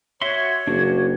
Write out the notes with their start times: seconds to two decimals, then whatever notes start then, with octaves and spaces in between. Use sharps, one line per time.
0.22 F#4 C#5 E5 C6
0.67 F#1 D4 F#4